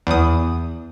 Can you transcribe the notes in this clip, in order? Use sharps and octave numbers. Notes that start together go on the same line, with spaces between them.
E2 D#6